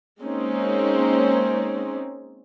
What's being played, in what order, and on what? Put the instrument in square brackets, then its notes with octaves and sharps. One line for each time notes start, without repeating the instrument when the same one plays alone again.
[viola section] G#3 A#3 C4 C#4 D#4